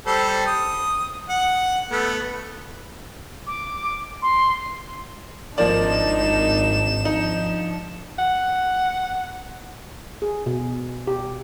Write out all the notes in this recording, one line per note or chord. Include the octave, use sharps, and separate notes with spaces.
G3 A4 C5
D#6
F#5
A3 B3
D6
C6
G#1 F3 A#3 D4 D#4 D5 E7
F3 D4 D#4
F#5
G#4
B2
G4